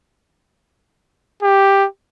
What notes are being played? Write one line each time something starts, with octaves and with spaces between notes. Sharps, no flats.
G4